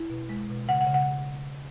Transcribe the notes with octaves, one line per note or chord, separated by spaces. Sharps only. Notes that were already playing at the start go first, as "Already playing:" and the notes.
Already playing: E4
B2
G#3
B2
C#3 F#5
F#5
C#3
F#5